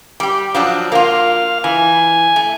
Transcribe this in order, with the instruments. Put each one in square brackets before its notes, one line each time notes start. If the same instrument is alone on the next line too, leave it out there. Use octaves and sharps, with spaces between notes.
[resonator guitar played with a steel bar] G3 G4
F3 F#3 D4
[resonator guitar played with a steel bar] A#3 F4 [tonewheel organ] F5
[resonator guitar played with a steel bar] E3 [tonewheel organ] G#5
[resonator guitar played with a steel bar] A3